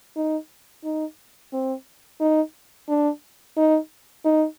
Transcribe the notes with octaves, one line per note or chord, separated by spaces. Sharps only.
D#4
D#4
C4
D#4
D4
D#4
D#4